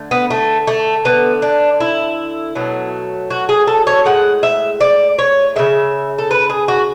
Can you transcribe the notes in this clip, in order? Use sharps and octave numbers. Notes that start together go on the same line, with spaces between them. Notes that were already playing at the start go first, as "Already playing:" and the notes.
Already playing: D3 A3
B3
A3
A3
D3 A3 B3
D4
E4
B2 F#3 A3
F#4
G#4
A4
C#5
A2 G#3 F#5
E5
D5
C#5
C#3 G#3 E5
A4
B4
G#4
F#4